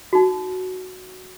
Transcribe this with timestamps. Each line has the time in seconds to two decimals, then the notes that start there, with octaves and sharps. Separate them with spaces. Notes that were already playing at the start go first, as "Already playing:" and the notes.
0.13 D#4 F#4